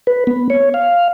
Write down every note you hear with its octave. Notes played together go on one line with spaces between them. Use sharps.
B4
B3
C#5
F5